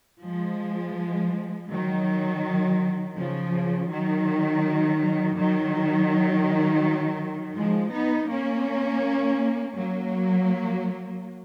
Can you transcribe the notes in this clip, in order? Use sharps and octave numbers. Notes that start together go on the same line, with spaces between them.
F3 G#3
D#3 F#3
C#3 F3
D#3 F#3
D#3 F#3
F3 G#3
B3 D#4
A#3 C#4
F#3 A#3